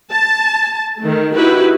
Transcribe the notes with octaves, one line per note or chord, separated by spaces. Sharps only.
A5
D#3 A3
D#4 E4 F#4 G4 B4